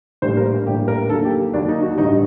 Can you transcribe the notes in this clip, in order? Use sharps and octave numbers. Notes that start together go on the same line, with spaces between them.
A#1 A2 G3 A#3 C5
A#4
A#1 A2 G3 A#3 G4
A#4
D#2 D3 F#3 A#3 A4
G4
D#2 D3 F#3 A#3 D4
D#4
F#4
A1 G2 D3 G3 D#4